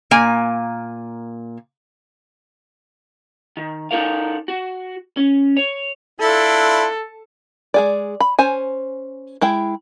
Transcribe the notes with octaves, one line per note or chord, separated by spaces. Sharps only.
A#2 A#3 G#5
D#3
D#4 E4 A4 A#4 F5
F#4
C#4
C#5
D4 E4 F4 A4
G#3 G#4 D5
B5
C#4 C5 G#5
G#3 E4 G5